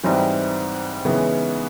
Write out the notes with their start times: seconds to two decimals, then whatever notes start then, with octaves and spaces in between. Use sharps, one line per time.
0.04 G#2 E3 G3 C4 D#4
1.05 C#3 E3 G#3 B3 D#4